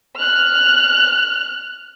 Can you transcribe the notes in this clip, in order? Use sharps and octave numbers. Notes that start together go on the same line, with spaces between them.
F6 F#6